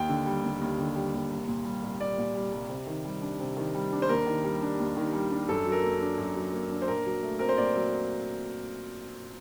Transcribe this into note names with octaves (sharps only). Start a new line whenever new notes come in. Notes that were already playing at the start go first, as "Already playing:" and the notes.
Already playing: D#2 G5
D3
G3
D#2
D#2
D3
G3
D#2
C2
A#2
G3
C2
C2 D5
A#2
G3
C2
C3
D#3
G3
D4
C3
D#3
G3
D4
C5
D#2 A#4
D#3
G3
D4
D#2
D#3
G3
D4
F#2 A4
F#3
A#4
A#3
D4
F#2
F#3
A#3
D4
C5
A#2 A#4
F#3
A3
C4 A#4
C5
A#2 D5
F#3